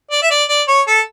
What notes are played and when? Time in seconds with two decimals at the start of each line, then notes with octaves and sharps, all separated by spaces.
0.11 D5
0.23 E5
0.30 D5
0.49 D5
0.68 C#5
0.87 A4